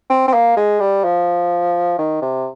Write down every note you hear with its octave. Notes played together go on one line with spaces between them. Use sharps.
C4
C4
A#3
G#3
G3
F3
D#3
C3